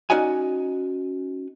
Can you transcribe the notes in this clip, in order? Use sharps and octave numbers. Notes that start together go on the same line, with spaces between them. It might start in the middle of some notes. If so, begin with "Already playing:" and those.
C#4 D#4 F#4 D5 D#5 G#5